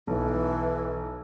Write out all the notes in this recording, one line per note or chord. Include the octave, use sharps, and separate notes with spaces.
B1 E3